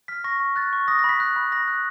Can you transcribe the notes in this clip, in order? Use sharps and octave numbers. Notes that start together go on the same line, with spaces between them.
F6 B6
C#6 A#6
C#6
F#6 A6
C#6
D#6 A#6
A#6
B5
B6
F#6
B5
B5 A#6
F#6